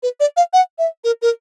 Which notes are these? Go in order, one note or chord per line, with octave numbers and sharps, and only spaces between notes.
B4
D5
F5
F#5
E5
A#4
A#4